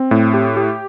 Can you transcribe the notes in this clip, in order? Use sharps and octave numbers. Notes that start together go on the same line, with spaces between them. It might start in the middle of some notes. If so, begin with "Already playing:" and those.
Already playing: C4
A2
G4
G4